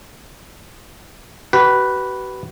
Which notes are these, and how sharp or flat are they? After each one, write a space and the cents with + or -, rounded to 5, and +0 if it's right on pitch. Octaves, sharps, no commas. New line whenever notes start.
F#4 +45 B4 +0